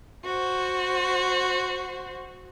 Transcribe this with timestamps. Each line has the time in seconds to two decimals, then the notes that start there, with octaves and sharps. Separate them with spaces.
0.24 F#4 C5